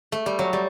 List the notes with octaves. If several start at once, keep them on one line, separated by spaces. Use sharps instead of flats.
A3
G3
F#3
G3